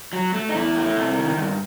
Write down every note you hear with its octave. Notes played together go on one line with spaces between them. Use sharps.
F#3
A3
D#4
E2 E4
A3
C3
D#3
G2